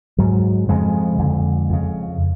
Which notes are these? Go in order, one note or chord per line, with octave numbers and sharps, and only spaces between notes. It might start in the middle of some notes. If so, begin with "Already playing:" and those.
G#2 F#3
F2 C#3 G#3
F2 D3
F2 C#3